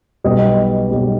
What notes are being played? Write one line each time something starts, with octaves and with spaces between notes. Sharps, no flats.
B1 B2 G3 B3 D#5
B1 B2 G3 B3